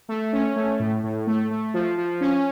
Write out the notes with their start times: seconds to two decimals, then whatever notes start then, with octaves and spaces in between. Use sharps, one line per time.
0.09 A3
0.33 C#4
0.56 A3
0.80 A2
1.04 A2
1.27 A3
1.51 A3
1.74 F3
1.98 F3
2.21 C#4